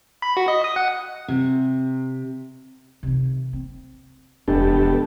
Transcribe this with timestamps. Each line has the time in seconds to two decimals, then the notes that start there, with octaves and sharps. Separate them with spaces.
0.22 B5
0.37 F#4
0.48 D#5
0.64 D#6
0.76 F#5
1.28 C3
3.03 C3 D#3
3.53 C4
4.48 E1 F2 G#3 B3 D4 G4 A4